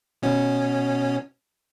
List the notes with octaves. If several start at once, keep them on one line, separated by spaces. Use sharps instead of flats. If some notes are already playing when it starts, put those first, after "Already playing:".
B2 C#4